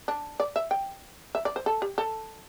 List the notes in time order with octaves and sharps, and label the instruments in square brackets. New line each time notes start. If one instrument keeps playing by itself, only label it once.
[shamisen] D4
D5
E5
G5
E5
D5
C5
A4
G4
A4